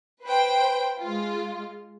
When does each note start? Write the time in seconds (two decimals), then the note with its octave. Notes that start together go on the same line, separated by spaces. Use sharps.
0.23 B4 C5 G5
1.00 G#3 F4